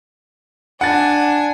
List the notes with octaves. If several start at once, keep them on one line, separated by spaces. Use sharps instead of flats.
D4 F#5 G#5 A6